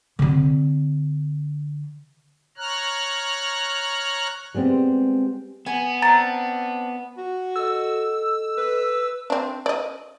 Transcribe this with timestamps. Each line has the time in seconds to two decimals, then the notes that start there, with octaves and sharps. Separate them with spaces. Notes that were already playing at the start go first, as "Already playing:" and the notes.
0.19 D3 C4
2.57 C#5 A#5 F6 F#6
4.55 G3 G#3 B3 C4 G4
5.66 B3 G#5
6.02 C4 D4 A#5 A6
7.17 F#4
7.56 A4 D#5 E6
8.57 B4
9.30 C4 D4
9.66 D5 D#5